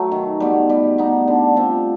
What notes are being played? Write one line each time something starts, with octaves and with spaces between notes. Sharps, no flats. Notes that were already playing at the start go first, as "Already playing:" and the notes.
Already playing: F#3 A3
D#3
G3 B3
G3
B3 D#4
D3
G3 C4 F4